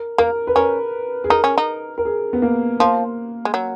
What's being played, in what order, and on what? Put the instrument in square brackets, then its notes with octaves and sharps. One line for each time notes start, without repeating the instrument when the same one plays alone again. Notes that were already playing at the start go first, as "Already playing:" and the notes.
Already playing: [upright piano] A#4
[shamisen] A#3 [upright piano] A#4
[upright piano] B4
[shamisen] C#4 [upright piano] A#4
[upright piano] G#4
[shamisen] D#4 [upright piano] A#4
[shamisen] C#4
D#4
[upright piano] A#4
G#4
B3
A#3
[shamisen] F3 [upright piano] A#3
[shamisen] G#3
F#3